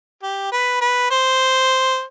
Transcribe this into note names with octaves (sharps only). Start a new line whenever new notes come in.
G4
B4
B4
C5